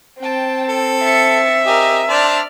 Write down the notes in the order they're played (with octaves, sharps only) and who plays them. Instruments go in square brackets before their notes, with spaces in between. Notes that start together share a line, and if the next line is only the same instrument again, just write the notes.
[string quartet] C4 [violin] G5 A5
[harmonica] A4
[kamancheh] E5 [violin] A6 C#7
[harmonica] G4 D#5 [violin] A#4 G#5
[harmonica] D4 C5 A5 [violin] D5 F6